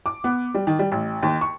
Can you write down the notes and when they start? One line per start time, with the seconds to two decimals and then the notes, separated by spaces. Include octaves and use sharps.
0.06 D6
0.24 B3
0.54 G3
0.67 D#3
0.79 G3
0.92 A1
1.23 D#2
1.41 C#6